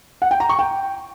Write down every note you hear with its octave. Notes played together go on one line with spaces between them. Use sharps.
F#5
G5
A#5
C#6
G5